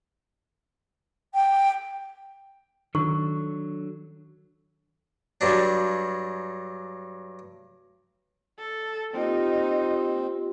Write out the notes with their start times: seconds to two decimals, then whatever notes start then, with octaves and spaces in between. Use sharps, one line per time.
1.34 G5
2.95 D#3 F#3 D4 A4 C#6
5.41 G2 F#3 D4
8.58 A4
9.14 A#3 C4 D#4 F4 G4